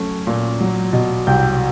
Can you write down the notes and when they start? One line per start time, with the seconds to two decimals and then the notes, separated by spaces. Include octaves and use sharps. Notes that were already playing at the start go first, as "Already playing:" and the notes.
Already playing: F#3 A3 C#4
0.27 A#2
0.61 F#3
0.93 B2
1.27 C2 G5 G6